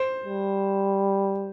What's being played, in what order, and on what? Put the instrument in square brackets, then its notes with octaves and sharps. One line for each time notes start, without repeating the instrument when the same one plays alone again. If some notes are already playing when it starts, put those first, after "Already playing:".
Already playing: [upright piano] C5
[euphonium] G3